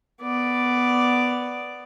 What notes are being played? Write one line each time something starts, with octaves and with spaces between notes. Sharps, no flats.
B3 D5